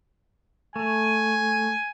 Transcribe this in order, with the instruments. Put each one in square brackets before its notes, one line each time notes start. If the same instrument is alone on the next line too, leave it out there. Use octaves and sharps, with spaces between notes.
[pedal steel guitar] A3 [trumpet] G#5